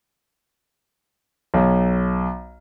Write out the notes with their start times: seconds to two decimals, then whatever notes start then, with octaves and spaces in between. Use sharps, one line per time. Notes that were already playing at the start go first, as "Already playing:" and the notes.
1.54 B1